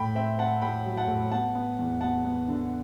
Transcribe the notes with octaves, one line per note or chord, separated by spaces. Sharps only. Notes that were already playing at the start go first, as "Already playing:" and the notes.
Already playing: A2 G5 B5
C4 E5 G5
C4 F#5 A5
A2 G5 B5
F#3
F#5 A5
A2
B3 F#5 A5
B3
E2
B3 F#5 A5
B3
D3